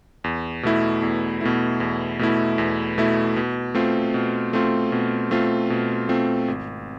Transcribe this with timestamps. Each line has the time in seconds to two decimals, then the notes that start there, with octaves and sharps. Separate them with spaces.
0.24 E2
0.63 B2 A3 E4
1.02 E2
1.41 B2 A3 E4
1.80 E2
2.19 B2 A3 E4
2.58 E2
2.98 B2 A3 E4
3.36 B2
3.75 A3 C4 F4
4.14 B2
4.53 A3 C4 F4
4.92 B2
5.31 A3 C4 F4
5.70 B2
6.09 A3 C4 F4
6.48 G#1